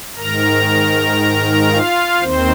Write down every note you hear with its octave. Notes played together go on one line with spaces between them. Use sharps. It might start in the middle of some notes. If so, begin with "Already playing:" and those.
G#2 D#3 A#4 A#5
F4 F5
D#2 D#3 C4 C5